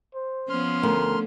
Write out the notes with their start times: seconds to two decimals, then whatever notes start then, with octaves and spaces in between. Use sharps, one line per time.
0.15 C5
0.49 F3 B3 C#4 C6 F6
0.83 D2 A#4